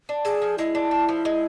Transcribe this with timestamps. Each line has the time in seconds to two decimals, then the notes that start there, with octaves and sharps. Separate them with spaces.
0.09 D4
0.25 G#4 A4
0.42 F3
0.58 G#3 E4
0.75 D4
0.91 A4
1.09 F3
1.25 G#3